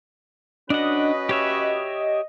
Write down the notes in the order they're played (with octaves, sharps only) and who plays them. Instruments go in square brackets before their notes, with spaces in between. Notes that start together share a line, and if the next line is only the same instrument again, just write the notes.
[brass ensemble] C#4 F#4 B4 [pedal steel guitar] D4 F#5 [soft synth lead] D#5
[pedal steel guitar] G4 C#5 E5